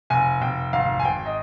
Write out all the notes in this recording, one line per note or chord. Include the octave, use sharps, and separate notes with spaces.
F1 G#5
F1 G5
G#1 F5
G#5
G#1 G5
D#5